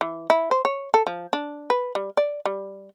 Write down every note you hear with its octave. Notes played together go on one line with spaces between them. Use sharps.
E3
E4
C5
C#5
A4
F3
D4
B4
G3
D5
G3